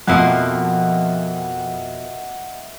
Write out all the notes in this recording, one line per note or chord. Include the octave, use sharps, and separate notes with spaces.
F2 B2 F3 A#3 D#5 E5 F#5